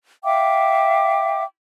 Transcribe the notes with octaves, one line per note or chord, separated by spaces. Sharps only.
E5 F5 G5 D6